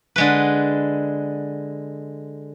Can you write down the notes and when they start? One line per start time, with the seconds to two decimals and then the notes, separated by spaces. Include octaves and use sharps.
0.16 D3 G#3 B4